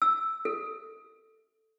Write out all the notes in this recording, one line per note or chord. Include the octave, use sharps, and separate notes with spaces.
E6
A4